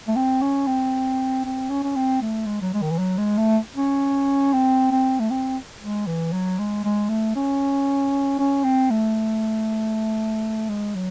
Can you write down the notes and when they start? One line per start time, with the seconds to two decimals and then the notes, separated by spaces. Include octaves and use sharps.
0.08 A3
0.16 C4
0.42 C#4
0.67 C4
1.45 C4
1.69 C#4
1.83 C#4
1.96 C4
2.22 A3
2.47 G#3
2.62 F#3
2.73 G#3
2.82 D#3
2.91 E3
2.99 F#3
3.18 G#3
3.38 A3
3.76 C#4
4.53 C4
4.91 C4
5.20 A3
5.30 C4
5.82 G#3
6.06 E3
6.33 F#3
6.59 G#3
6.84 G#3
7.10 A3
7.35 C#4
8.39 C#4
8.64 C4
8.90 A3
10.69 G#3
10.95 F#3